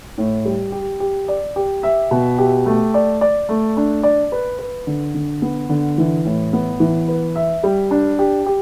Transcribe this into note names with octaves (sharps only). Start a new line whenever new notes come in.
A2
G3
G4
G4
D5
G4
E5
B2
G4
A3
D5
D5
A3
D4
D5
B4
B4
D3
D3
B3
D3
E3
A2
B3
E3
B4
E5
G3
D4
G4
G4